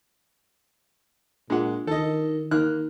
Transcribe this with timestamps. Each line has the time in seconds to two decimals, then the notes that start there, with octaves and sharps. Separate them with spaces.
1.50 A#2 G#3 D4 F4 F#5
1.87 D#3 A4 D#5
2.51 D#3 A#3 D#4 F6 F#6